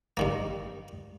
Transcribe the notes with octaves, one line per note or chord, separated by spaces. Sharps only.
G2 D#3 A#3